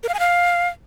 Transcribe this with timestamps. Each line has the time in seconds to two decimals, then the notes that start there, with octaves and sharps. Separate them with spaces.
0.03 A#4
0.09 F5
0.14 G#5
0.19 F5